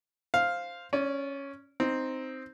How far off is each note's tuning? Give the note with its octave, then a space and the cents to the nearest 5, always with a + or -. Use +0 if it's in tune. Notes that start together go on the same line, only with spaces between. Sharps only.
C5 +0 F5 +0
C#4 +0 D5 -30
C4 +0 D#4 +0